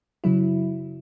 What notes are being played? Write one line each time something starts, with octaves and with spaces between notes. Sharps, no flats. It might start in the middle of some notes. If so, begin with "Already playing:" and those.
F#2 C#3 F#3 E4